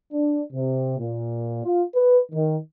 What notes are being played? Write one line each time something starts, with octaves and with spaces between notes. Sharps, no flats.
D4
C3
A#2
F4
B4
D#3